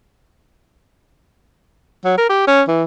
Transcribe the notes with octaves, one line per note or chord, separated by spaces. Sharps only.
F#3
A#4
G4
C#4
E3